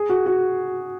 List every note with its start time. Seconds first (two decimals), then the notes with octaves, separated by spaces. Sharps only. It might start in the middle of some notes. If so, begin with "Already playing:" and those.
Already playing: G#4
0.09 F#4
0.26 F#4